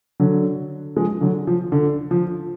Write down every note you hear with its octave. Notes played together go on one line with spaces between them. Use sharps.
D3 F#3
F3 G#3
D3 F#3
F3
D3
F3